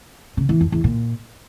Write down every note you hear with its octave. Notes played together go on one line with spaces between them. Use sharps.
C#3
E3
F2
E2
A#2